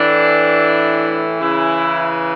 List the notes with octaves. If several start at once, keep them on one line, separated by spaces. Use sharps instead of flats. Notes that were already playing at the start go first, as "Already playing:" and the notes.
Already playing: A2 E3 D4
C#3 E3 E4